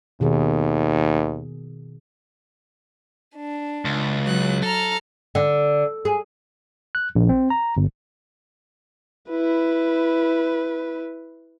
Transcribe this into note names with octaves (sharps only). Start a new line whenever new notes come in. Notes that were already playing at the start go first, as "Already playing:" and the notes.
D#2 B2 D#3 G#4
D4
C#2
F#3 F#6
A4 A#5 F6
D3
G#4
F#6
A#1
C4
A#5
G1
E4 B4